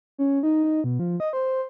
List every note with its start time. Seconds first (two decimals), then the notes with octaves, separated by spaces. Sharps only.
0.18 C#4
0.43 D#4
0.63 D#4
0.84 B2
0.99 F3
1.20 D#5
1.33 C5